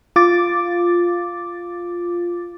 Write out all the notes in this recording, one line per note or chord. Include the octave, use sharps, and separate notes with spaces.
F4 D6 A6